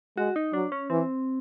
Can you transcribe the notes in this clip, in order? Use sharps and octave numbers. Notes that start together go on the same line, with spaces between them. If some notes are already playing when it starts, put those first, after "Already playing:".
G#3 F#4
D#4
F#3 D4
C#4
E3 C4